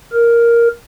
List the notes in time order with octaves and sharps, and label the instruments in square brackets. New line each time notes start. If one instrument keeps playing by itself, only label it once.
[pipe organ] A#4